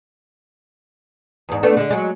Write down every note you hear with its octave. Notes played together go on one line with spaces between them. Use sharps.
E2 G#2
A3 B3 D4
D3 G#3
F#3 G#3